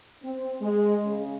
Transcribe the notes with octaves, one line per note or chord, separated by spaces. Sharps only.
C4
G#3
C#3